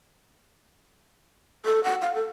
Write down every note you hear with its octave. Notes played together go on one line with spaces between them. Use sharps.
A4
F#5
F5
A4